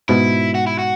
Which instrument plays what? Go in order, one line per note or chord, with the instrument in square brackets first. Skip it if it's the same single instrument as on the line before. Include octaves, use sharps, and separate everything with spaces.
[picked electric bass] G#2 B2 [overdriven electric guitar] E4
[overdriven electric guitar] F#4
E4
F#4